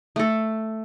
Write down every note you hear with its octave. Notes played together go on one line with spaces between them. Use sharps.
A3 A4